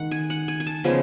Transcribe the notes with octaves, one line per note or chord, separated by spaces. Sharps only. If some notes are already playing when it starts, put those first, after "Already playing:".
Already playing: D#3 G#3 F#5
G#5
F#5
G#5
G#5
A5
C#3 F3 G#3 B3 G#5